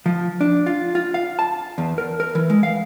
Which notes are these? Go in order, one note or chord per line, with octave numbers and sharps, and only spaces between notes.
F3
D4
F4
F4
F5
A5
E2
A#4
A#4
E3
G#3
F5